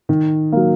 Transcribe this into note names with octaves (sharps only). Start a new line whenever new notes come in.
D#3
F#3 A#3